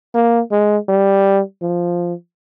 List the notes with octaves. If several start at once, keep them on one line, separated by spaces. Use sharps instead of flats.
A#3
G#3
G3
F3